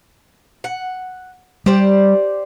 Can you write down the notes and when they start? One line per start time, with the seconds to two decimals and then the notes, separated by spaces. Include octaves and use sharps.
0.64 F#5
1.66 G3 G4 C5 D5